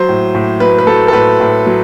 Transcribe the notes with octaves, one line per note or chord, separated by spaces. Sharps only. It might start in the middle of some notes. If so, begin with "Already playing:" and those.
Already playing: F#3 C5
A2
A2
F#3 B4
B4
F#3 A4
A4
A2 B4
A2
F#3